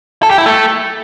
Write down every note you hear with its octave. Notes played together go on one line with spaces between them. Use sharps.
A4
G4
E4
A3